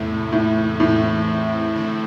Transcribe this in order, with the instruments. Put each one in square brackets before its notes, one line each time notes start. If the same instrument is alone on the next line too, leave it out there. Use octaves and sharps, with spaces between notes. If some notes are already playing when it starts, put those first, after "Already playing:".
Already playing: [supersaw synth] E2 C3 A3 E4 [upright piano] A2
[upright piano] A2
[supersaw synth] E2 E3 C4 E4 [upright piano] A2
[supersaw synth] D3 A3 C4 E4